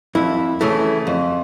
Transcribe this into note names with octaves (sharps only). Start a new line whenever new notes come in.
F2 E4
C#3 E3 A3
F2